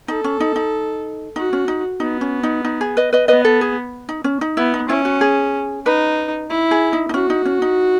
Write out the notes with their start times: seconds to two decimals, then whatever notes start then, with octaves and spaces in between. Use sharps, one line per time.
0.08 D#4 A4
0.24 C#4
0.40 D#4
0.56 D#4
1.36 D#4 F#4
1.53 C#4
1.68 D#4
2.00 B3 D#4
2.21 C#4
2.43 D#4
2.65 D#4
2.81 G#4
2.97 B4 D#5
3.13 B4 D#5
3.28 B3 B4 D#5
3.45 A4
3.61 G#4
4.09 D#4
4.24 C#4
4.41 D#4
4.57 B3 E4
4.74 D#4
4.89 C#4 E4
5.05 F#4
5.21 G#4
5.85 D#4 B4
6.49 E4
6.71 G#4
6.93 D#4
7.09 D#4
7.14 C#4 F#4
7.30 D#4
7.45 C#4
7.62 D#4